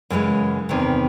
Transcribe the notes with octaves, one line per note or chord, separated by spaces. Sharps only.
F#2 C#3 E3 G#3
E2 C3 D#3